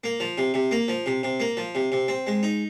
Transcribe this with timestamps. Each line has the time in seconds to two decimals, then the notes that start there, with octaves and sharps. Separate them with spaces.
0.04 A#3
0.20 F3
0.38 C3
0.54 C3
0.71 A#3
0.88 F3
1.06 C3
1.23 C3
1.40 A#3
1.57 F3
1.75 C3
1.92 C3
2.08 C4
2.27 G#3
2.43 D#4